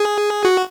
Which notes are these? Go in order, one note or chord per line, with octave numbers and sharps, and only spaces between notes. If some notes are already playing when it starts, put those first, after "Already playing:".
Already playing: G#4
F#4